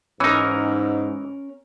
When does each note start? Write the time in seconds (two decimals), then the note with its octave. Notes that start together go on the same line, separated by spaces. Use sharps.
0.20 G#2 E3 C#4 D#4 A#4